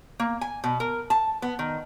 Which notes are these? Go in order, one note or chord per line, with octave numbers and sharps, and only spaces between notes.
A#3
G#5
B2
A#4
A5
B3
D#3